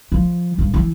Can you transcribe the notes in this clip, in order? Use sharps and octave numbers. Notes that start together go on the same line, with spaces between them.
F3
G2
E3